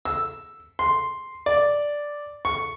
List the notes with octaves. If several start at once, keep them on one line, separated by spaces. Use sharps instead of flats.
E6
C6
D5
C#6